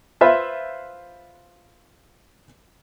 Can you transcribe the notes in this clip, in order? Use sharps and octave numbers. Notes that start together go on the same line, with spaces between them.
F4 B4 C5 E5 B5